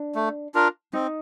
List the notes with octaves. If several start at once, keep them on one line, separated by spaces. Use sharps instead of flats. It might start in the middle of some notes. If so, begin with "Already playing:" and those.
Already playing: D4
A3
D4 F4 A#4
C4 D#4